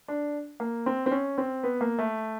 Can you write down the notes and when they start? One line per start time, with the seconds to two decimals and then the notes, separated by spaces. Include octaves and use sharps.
0.08 D4
0.60 A#3
0.86 C4
1.06 C4
1.11 C#4
1.38 C4
1.63 B3
1.81 A#3
1.99 A3